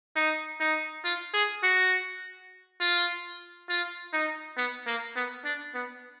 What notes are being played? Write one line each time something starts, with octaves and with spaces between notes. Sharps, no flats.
D#4
D#4
F4
G#4
F#4
F4
F4
D#4
B3
A#3
B3
D4
B3